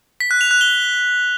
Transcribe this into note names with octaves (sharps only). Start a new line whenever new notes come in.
B6
F#6
F7
F#6
G7